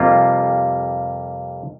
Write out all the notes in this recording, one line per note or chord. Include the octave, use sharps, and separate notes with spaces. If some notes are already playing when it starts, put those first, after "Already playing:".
Already playing: F2 C3 G3 A#3 F4